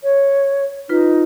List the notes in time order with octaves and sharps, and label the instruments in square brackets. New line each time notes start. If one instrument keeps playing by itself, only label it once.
[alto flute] C#5
[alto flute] D#4 [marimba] F4 B4